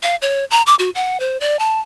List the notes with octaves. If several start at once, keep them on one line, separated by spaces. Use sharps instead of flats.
F5
C#5
A#5
D6
F#4
F#5
C5
D5
A5